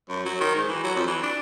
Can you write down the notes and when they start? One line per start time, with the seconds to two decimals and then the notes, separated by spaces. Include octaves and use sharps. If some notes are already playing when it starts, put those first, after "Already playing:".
0.09 F#2
0.26 F#3
0.40 D#3
0.55 G#2
0.68 E3
0.84 F#3
0.96 F2
1.07 E3
1.22 D4